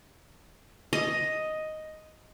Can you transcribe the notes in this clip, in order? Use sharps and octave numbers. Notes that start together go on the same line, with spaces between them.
D#5